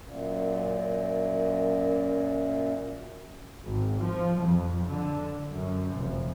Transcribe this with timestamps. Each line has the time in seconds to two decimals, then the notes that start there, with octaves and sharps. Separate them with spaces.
0.01 F#2 A#2
3.63 G#1
4.00 F3
4.40 F2
4.86 D3
5.52 F#2
5.93 F1